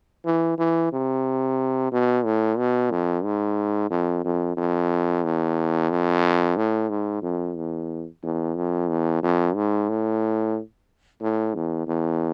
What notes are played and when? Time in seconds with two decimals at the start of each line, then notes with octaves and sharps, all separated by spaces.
0.25 E3
0.58 E3
0.92 C3
1.92 B2
2.25 A2
2.58 B2
2.91 F2
3.24 G#2
3.90 F2
4.24 F2
4.57 F2
5.24 E2
5.90 F2
6.57 A2
6.89 G#2
7.22 F2
7.56 E2
8.22 E2
8.56 F2
8.89 E2
9.23 F2
9.55 G#2
9.89 A2
11.21 A2
11.54 E2
11.87 E2